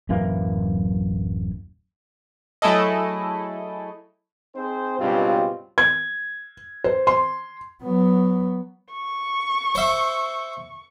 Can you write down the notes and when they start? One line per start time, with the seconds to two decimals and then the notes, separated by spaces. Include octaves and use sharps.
0.09 D1 F#2 E3 A#3
2.62 F#3 A3 E4 G#4 A4 D#5
4.56 C4 D#4 G#4 C5
4.99 C#2 G2 B2 C4 F4 G4
5.78 G#6
6.84 C5
7.07 C6
7.83 F#3 B3
8.92 C#6
9.75 C5 E5